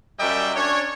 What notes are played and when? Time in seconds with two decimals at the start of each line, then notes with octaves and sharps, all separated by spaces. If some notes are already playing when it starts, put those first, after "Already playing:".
0.20 F#2 G3 D#5 E5 G5
0.56 C#4 D4 C#5